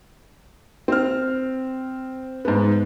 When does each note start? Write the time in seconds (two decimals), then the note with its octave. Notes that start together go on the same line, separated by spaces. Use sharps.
0.88 C4 F6
2.45 G#2 G#3 B3